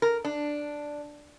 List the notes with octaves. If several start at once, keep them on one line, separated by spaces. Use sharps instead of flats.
A#4
D4